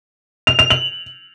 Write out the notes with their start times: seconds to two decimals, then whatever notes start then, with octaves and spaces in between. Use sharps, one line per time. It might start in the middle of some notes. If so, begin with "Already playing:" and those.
0.47 F7
0.59 F7
0.70 F#7